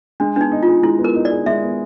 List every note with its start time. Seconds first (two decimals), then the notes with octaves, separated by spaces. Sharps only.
0.20 G#3 D4
0.36 B3 D4
0.41 D#4
0.52 D#4
0.63 F4
0.67 G#4
0.83 G#3 E4
0.98 B3
1.04 A#4
1.15 D#4
1.25 D5
1.31 G#4
1.46 G#3 E5
1.63 B3